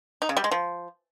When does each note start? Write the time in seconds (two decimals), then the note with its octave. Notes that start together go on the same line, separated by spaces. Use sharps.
0.22 D#4
0.29 C#3
0.37 G3
0.44 G#3
0.51 F3